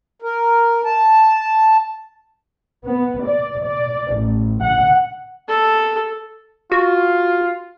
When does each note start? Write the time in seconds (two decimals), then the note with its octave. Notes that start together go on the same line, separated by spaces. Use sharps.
0.22 A#4
0.85 A5
2.85 B3
3.25 D5
3.63 D5
4.15 A1
4.63 F#5
5.49 A4
6.72 F4 F#4